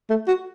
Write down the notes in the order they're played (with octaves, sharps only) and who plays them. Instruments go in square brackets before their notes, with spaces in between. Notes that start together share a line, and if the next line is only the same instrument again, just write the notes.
[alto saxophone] A3
F#4